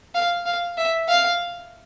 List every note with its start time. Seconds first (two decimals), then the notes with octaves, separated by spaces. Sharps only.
0.15 F5
0.46 F5
0.78 E5
1.08 F5